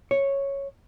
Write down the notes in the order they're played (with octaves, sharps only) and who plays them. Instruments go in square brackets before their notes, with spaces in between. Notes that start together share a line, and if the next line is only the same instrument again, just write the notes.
[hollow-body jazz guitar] C#5